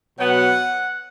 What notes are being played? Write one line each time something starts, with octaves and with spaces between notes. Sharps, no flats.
B2 F#3 B3 F#5